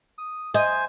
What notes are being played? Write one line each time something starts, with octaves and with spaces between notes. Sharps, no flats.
D#6
C5 D#5 G#5